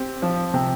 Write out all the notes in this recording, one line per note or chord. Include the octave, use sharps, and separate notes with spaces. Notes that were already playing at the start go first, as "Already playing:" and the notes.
Already playing: C4 G4
F3
C3